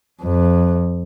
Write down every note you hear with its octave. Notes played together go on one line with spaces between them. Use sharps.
F2